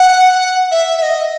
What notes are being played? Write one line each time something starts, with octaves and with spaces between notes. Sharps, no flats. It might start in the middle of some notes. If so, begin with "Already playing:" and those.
Already playing: F#5
E5
E5
D#5